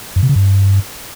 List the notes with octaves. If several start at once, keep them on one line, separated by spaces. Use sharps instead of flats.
F#2
C3
C#3
G2